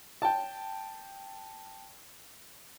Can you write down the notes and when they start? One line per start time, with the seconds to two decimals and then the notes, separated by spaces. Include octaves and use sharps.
0.22 G5 A5